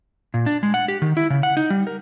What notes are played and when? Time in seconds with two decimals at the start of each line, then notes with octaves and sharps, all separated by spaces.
0.34 A#2
0.46 D4
0.63 G#3
0.74 F#5
0.88 G4
1.02 D#3
1.17 E4
1.30 C#3
1.43 F#5
1.57 D#4
1.70 G3
1.87 A#4